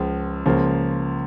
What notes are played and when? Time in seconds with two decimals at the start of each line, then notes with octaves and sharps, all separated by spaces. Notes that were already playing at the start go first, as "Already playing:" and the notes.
Already playing: C#2 C#3 F3
0.45 C#2 C#3 F3 A#3